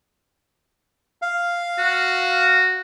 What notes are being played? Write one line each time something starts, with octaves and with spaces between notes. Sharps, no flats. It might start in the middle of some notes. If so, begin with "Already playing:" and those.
F5
F#4